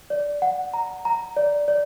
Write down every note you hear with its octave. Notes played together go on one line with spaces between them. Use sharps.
D5
F#5
A#5
A#5
D5
D5